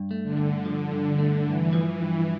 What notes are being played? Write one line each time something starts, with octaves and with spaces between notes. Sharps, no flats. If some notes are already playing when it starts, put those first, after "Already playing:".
Already playing: G2
A3
D3
G2
D3 F3
G2
A3
G2 E3
F3
E3
G2